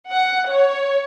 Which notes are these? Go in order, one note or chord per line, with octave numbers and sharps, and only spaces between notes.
F#5
C#5